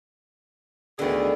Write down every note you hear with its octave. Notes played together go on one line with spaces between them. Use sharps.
D2 D3 D#3 B3 G#4